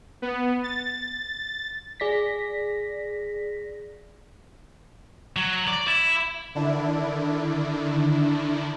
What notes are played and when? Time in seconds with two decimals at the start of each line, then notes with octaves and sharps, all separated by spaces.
0.22 B3
0.63 A6
2.00 G#4 D5 A#6 B6
5.36 F#3
5.68 D5
5.88 E4
6.55 D3 D#3 D4 E4